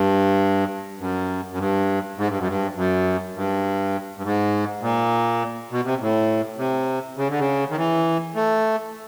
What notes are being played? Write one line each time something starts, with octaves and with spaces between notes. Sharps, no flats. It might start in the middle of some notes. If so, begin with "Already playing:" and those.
Already playing: G2
F#2
F#2
G2
G#2
G2
F#2
G2
F#2
G2
G2
G#2
A#2
B2
C3
A2
C3
C#3
D3
C#3
D#3
E3
A3